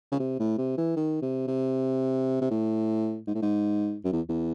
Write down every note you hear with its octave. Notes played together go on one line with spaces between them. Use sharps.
C#3
C3
A2
C3
E3
D#3
C3
C3
C3
A2
G#2
A2
G#2
F#2
E2
E2